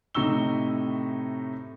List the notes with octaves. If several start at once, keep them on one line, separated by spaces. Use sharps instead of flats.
A2 C3 D#4 C#6 E6 G7